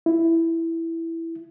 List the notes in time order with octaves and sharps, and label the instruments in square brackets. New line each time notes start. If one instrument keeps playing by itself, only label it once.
[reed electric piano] E4